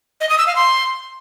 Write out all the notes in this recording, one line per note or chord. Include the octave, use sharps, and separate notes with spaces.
D#5
D#6
E6
F5
C6